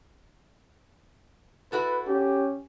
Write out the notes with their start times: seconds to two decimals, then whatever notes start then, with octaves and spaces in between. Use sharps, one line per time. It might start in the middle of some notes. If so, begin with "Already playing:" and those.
1.72 E4 F#4 A4 B4
2.07 C#4 G4